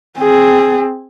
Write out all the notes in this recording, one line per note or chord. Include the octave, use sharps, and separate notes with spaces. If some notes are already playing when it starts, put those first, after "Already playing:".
C4 G#4